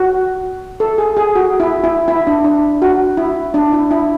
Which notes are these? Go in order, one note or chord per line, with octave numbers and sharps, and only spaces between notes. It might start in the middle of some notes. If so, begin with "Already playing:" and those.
Already playing: F#4
A4
G#4
G#4
F#4
E4
E4
E4
D4
D4
F#4
E4
D4
E4
E4